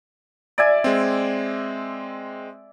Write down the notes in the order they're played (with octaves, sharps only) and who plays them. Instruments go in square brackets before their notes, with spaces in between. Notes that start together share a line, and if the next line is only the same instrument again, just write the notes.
[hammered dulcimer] D5 E5 G#5
[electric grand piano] G#3 C4